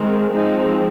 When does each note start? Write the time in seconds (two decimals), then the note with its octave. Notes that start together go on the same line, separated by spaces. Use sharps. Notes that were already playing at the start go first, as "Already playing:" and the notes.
Already playing: D#3 G#3 C4
0.30 F3 G#3 C4 D#4